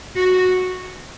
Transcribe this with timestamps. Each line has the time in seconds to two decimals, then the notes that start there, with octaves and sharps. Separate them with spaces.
0.16 F#4